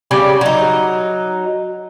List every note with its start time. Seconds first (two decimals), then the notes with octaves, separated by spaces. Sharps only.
0.11 C#3 G3 D5
0.41 F#3 D#4